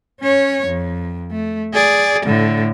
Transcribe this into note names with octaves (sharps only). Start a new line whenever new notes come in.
C#4 C#5
F2
A3
G#4 D5
A2 D3